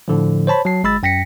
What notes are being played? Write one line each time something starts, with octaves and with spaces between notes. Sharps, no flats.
A2 D3 F3
C5 C#5 A5 B5
F#3 A5 C7
G1 G#3 B5 E6 A6
F#2 G5 A#6 B6 C#7